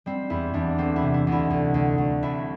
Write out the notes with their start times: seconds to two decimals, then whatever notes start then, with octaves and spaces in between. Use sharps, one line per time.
0.06 G3 C4
0.30 E2 E4
0.54 E2 D4
0.78 D2 C4
0.96 E4
1.02 C3
1.14 E4
1.27 D2
1.32 E4
1.50 D2
1.74 D2
1.98 D2
2.23 C2 E4